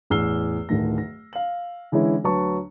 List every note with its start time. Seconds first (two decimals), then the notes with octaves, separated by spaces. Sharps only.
0.10 A1 E2 E6 F6 C7 G7
0.69 D1 A2 D#3 A3 A#6
0.98 A#6
1.33 F5 F#7
1.92 D3 E3 G#3 C#4 E4
2.24 D2 F#3 B4 A5 C#6